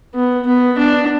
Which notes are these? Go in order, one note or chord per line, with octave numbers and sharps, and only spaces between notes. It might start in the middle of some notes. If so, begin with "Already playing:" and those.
B3
B3
D4